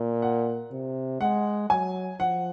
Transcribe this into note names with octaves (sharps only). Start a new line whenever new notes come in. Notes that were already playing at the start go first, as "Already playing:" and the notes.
Already playing: A#2
F#5
C3
G#3 F#5
F#3 G#5
F3 F#5